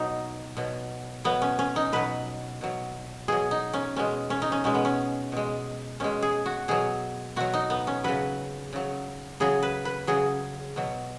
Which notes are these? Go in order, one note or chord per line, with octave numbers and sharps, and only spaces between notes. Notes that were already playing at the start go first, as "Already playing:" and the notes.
Already playing: B2 F#3 D#4
B2 F#3
B2 F#3 B3
C#4
C#4
D#4
B2 F#3 B4
B2 F#3
B2 F#3 G#4
D#4
C#4
B2 G#3 C#4
C#4
D#4
C#4
B2 G#3 C#4
B3
C#4
B2 G#3
B2 G#3 C#4
G#4
F#4
B2 F#3 G#4
B2 F#3 F#4
D#4
B3
C#4
C#3 F#3 B4
C#3 F#3
C#3 F#3 G#4
B4
B4
C#3 F#3 G#4
B2 F#3